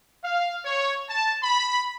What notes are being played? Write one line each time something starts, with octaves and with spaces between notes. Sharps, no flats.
F5
C#5
A5
B5